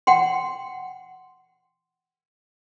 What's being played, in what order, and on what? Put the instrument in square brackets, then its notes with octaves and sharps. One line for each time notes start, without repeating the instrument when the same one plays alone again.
[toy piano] F#5 G5 C6